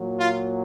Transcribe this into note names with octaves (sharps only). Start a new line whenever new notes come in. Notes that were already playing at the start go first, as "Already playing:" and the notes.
Already playing: A#2 F#3
F4